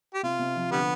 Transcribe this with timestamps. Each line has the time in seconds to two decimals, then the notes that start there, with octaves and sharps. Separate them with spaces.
0.14 G4
0.23 C3 F4
0.39 C3
0.56 F3
0.71 D3 G3 B3